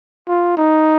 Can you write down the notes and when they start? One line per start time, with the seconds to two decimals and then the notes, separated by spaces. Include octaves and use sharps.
0.28 F4
0.57 D#4